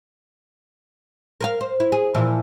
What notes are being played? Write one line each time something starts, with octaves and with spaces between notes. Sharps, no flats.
A#4 B4 F5
C5
E4
G#4
A#2 E3 F3